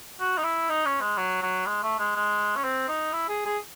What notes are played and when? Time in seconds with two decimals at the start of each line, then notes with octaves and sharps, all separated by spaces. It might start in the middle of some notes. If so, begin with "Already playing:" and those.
0.20 F#4
0.38 D#4
0.44 E4
0.70 D#4
0.86 C#4
1.01 G#3
1.17 F#3
1.42 F#3
1.66 G#3
1.83 A3
1.99 G#3
2.16 G#3
2.56 C#4
2.64 C4
2.89 D#4
3.13 E4
3.29 G#4
3.46 G#4